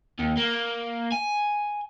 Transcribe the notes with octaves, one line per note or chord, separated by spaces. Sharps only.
D#2
A#3
G#5